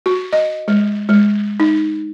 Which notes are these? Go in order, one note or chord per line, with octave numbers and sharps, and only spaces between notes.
F#4
D#5
G#3
G#3
D#4